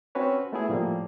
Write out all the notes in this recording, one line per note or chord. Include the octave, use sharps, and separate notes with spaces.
C4 C#4 F#4 B4 C#5
A3 B3 E4 G#4
A2 F3 G3 A#3